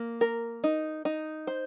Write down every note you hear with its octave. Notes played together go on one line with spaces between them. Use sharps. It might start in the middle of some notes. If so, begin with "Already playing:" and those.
Already playing: A#3
A#4
D#4
D#4
C5